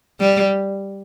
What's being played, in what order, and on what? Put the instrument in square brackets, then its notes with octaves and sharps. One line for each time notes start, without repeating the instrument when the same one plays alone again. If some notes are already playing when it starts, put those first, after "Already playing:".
[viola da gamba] G3